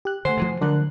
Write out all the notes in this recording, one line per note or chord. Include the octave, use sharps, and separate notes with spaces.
G4 F#6
D3 A3 C5 F#5 G#5
C3 E3 F3
D3 F3 F#3 A3 A#4 F#6